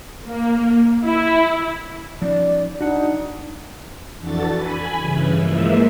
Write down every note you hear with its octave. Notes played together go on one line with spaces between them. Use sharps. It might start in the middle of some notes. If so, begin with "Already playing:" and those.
A#3
E4
F3 C#4 D#4 D5
D4 D#4 F#4 F#5
F2 E3 D4 F#4 A4 A6
G#5 B5
G2 C#3 E3
E3 F3 G#3 A#3 E5